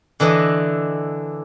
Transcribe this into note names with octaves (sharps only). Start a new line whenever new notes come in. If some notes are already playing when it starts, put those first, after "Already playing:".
D3 E3 D4 D#5